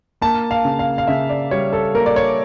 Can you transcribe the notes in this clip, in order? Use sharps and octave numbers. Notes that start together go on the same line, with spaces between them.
A#3 A5
F5
C#3
F5
F5
C#3 E5
D5
G3 C#5
A4
A#3 A#4
D5
C#5